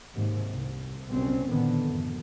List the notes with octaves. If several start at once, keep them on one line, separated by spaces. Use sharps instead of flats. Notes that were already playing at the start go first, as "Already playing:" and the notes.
D#2 G#2 C3
C2
F#1 C2 B2 C4 C#4
A#2 D3 D#3 B3
A1 F#2 A2